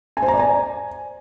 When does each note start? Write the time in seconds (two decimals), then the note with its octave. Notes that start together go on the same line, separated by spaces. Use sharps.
0.17 G#5
0.22 C5
0.28 A#5
0.34 D5
0.39 G#5